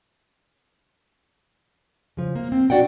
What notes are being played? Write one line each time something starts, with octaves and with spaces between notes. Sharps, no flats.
C#3 F3
A#3
C4
D4 F#4 D5 F#5 G5